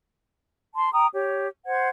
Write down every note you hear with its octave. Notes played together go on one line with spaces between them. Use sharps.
A5 C6
G5 A#5 D#6
G4 C#5
C5 F#5 G#6